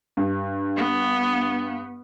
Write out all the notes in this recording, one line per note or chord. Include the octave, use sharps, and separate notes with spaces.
G2
B3